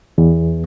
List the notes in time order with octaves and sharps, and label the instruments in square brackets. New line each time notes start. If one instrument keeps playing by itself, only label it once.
[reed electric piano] E2